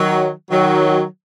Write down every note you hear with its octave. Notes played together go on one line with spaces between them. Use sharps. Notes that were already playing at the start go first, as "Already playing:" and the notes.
Already playing: D#3 F#3
D#3 F#3